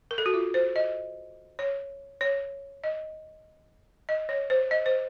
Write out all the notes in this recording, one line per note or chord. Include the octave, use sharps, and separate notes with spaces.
A#4
A4
F#4
F4
C5
D#5
C#5
C#5
D#5
D#5
C#5
C5
D#5
C5